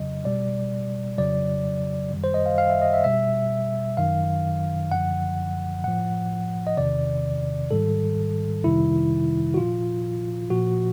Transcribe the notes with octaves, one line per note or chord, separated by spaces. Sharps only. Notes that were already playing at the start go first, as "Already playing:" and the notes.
Already playing: F2 C#3 F#3 D#5
B2 G3 D5
F2 C#3 F#3 D5
F#2 D#3 G3
C5
D#5
F5
F5
E5
D#5
E5
B2 G3 E5
F#2 D#3 F#3 F5
F#2 D3 F3 F#5
A2 F3 F#5
D#5
E2 C3 D#3 D5
G#2 D#3 G3 A4
F2 C3 D#3 G3 E4
F#4
A#2 F3 F4
A#2 F3 F#4